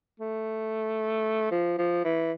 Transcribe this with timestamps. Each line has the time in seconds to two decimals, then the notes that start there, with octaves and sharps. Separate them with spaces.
0.20 A3
1.51 F3
1.78 F3
2.04 E3